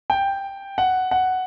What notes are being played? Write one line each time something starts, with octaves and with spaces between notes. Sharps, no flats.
G5
F#5
F#5